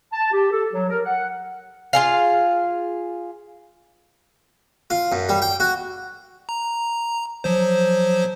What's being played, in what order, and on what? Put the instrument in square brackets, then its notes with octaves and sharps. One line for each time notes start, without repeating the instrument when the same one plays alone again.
[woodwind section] A5
G4
A4
F#3
A#4
F#5
[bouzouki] F4 G#4 F5
[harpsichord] F4
F#2
G3
G5
F#4
[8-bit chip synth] A#5
F3 F#3 C5